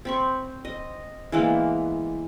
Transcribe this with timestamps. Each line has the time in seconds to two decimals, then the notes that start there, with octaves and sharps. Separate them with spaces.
0.05 C4 B5 C#6
0.65 D#5
1.32 E3 G#3 A#3 B3